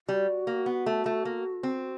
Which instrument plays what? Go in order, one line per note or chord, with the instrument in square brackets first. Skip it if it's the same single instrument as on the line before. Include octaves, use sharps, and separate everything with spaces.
[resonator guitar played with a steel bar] G3 [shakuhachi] F#4
[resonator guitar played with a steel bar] A#3
B3
A3
A3
A#3
C4